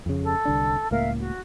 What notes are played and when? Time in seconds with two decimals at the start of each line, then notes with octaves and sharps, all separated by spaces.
0.06 F2 C#3
0.22 A4
0.45 C2 D3 D4
0.91 C#2 A2 A#3 A#4 E5 F5
1.19 F#4